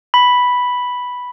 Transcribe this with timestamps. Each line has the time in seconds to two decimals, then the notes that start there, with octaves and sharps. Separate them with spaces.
0.14 B5